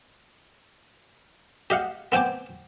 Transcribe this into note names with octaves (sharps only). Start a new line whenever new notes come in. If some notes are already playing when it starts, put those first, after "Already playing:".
G4 D#5 F5 F#5
B3 C4 G5 G#5 D6